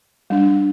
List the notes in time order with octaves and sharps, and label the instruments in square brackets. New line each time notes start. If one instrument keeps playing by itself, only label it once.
[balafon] G3 D4